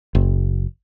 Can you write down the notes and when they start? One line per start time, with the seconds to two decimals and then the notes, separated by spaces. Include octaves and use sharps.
0.15 F#1